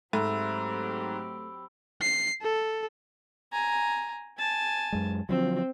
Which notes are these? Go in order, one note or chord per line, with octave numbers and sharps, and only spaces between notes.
G#2 F#3 A3 C4 G4 B5 E6
C7
A4
G#5 A#5
G#5 A5
F#2 G#3
D3 F3 F#3 C4